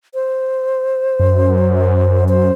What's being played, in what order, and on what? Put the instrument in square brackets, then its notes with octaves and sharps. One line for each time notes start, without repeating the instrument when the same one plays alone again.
[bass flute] C5
[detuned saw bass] F#2
[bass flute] C5